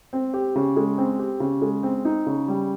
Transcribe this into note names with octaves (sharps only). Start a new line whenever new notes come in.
C4
G4
C#3
G#3
C4
G4
C#3
G#3
C4
D#4
C#3
G3